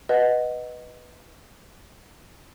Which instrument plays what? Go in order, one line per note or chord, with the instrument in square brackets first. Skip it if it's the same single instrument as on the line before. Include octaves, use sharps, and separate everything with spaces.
[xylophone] B4 D#5 F#5